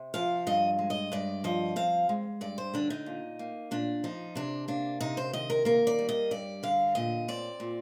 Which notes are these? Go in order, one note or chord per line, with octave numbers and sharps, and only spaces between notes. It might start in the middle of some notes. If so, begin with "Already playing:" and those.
Already playing: C3
F3 F5
G2 D#5
G#3
D#5
G2 D5
F3 D#5
C4 F5
G#3
G2 D5
C5
D3 D4
D#4
A#2
A#3
A#2 D4
F3 D#4
C3 D4
A#3 D4
C3 D#4
C5
D#3 D#5
A#4
A#3 A#4
D5
G3
D#5
G2 D5
D3 F5
A#2 D#5
C4 D5
A#2